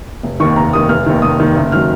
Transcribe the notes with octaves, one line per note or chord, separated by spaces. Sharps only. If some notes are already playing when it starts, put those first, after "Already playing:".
F1
D#2 D#3 C#6
F1 A#5
D#2 D#3 D#6
F1 F6
D#2 D#3
F1 D#6
D#2 D#3
F#1
D#3 F#3 F6